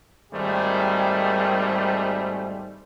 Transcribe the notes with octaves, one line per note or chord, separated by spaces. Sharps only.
G#1 D#3 G3 A3 G#4 C5